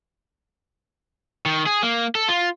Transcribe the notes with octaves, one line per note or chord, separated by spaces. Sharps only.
D#3
G#4
A#3
A4
F4